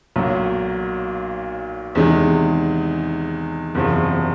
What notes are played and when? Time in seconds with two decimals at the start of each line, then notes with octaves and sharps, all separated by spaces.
0.16 B1 A#2 F#3
1.95 E2 C3 D#3 G#3
3.75 F#1 E2 C3 F3